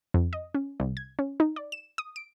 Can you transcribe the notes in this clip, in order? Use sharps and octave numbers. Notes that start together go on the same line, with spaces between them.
F2
D#5
C#4
C2
G#6
C#4
D#4
D5
E7
D#6
D7